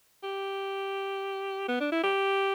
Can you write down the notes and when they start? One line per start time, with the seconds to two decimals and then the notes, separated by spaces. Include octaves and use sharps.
0.23 G4
1.68 B3
1.80 D4
1.92 E4
2.03 G4